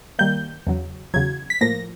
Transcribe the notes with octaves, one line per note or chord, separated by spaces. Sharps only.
D#3 G3 A#3 G6
E2 C#3 F#3
E2 C#3 F#3 G#6
B6
A2 F3 A#3 A#6